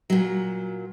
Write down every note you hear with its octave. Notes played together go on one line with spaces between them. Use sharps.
A#2 F#3